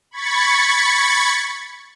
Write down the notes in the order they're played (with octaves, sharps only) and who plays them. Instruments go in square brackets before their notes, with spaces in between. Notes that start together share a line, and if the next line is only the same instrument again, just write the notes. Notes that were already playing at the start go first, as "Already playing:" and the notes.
[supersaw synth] B5 C#6 G#6 A6 B6 C#7